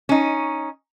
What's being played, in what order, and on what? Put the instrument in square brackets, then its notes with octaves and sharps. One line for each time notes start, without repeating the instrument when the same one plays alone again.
[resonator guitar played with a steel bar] C#4 D#4